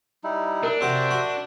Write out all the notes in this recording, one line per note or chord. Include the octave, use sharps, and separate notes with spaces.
G3 D#4 E4
D4 A#4
C3 F#4 C5 E5
F#4